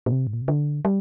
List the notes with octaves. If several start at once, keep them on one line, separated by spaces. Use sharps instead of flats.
A#2
C3
G#2
A#2
C3
D3
G3